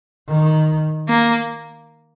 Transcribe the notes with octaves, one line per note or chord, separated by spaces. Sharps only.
D#3
A#3